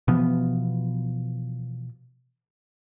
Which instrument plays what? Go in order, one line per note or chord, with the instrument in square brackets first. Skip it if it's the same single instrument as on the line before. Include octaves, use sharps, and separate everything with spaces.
[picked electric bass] B2 E3 F3 B3